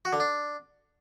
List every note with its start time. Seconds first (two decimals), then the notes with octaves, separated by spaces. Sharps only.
0.05 F#4
0.13 D3
0.20 D4